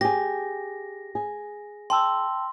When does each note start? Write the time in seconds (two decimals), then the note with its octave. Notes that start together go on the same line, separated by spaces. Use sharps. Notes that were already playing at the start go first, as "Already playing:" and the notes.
0.01 G4 G#4 A#6
1.15 G#4
1.90 G5 A5 C6 E6